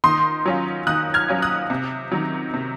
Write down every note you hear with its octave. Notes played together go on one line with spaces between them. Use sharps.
D#3 C6 D#6
F#3 C#4 F4
D#3 D#6 F#6
F6 G#6
F#3 C#4 F4
D#6 F#6
C3
D#3 F#3
C3